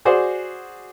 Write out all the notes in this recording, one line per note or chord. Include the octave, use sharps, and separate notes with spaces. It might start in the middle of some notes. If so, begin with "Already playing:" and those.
F#4 G#4 C5 D5 F#5